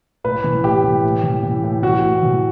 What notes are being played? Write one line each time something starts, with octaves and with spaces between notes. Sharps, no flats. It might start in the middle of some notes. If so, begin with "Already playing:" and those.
A2 B4
E3
A2 G4
E3
A2
E3
E3
A2
E3 F#4
A2
E3